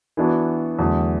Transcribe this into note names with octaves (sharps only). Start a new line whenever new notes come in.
E3 B3 D4 F#4
E2 D3 F#3 A3